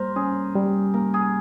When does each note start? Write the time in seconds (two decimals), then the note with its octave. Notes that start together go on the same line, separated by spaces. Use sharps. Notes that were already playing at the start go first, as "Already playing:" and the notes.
Already playing: G3 A#3 A#4 C5
0.16 C#4 G#4
0.55 G3
0.94 A#3 A#4
1.14 G#4